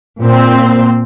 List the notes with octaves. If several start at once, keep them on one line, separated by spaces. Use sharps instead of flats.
A#2 C4